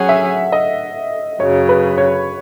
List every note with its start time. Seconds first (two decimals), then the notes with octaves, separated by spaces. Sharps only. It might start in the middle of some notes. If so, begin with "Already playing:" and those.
Already playing: F#3 C#4 G#4 F#5
0.09 E5
0.52 D#5
1.40 F#2 C#3 F#3 C#5
1.69 B4
1.98 C#5